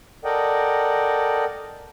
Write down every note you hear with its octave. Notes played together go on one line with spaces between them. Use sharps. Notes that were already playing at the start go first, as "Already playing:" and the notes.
A4 A#4 D5 D#5 F#5 G5